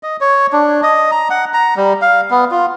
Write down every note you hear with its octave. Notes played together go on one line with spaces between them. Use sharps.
D#5
C#5
D4
D#5
A#5
F#5
A#5
G3
F5
B3
F4